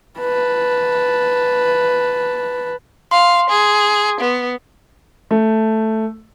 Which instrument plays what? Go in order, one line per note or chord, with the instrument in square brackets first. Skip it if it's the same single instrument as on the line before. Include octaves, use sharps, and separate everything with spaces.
[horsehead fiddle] B4 A5
[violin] F5 [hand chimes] C6
[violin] G#4
B3
[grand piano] A3